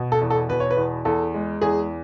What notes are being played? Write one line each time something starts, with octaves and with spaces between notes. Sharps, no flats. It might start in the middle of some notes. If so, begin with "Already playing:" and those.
Already playing: B2
A4
E2
A4
B2 B4
C#5
B4
E2
E2 A4
G#3
E2 G#4